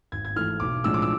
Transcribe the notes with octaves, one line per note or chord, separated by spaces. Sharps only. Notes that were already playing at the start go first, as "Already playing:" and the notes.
G#1 G#6
G#6
G#2 E3 A3 F6
B1 D6
A2 F3 G#3 D4 E6
D6
E6